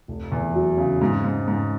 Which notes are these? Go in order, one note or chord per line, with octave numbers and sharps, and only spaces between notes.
F1
E2
F#3
C#3
G#2
G#2
G#2